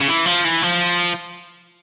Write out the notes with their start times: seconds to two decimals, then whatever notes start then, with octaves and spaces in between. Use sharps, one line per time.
0.01 C#3
0.08 E3
0.26 F3
0.45 E3
0.63 F3